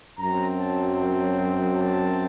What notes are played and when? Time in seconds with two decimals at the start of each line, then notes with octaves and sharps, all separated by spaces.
0.18 F#2 F#3 C4 A#5
0.58 A5
0.97 A5
1.76 A5